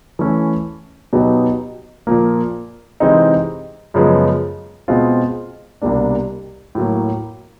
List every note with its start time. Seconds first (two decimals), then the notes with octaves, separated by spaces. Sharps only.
0.19 E3 A3 C#4 E4
1.13 B2 F#3 B3 D#4 G4
2.07 A#2 F3 A#3
3.00 C3 E3 G#3 C4 D#4
3.94 F#2 C#3 F3 G#3 B3
4.88 B2 G#3 C4 F4
5.82 C2 B2 G3 A#3 D4
6.75 A2 F#3 A#3